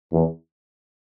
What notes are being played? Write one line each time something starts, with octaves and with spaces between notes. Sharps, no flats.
E2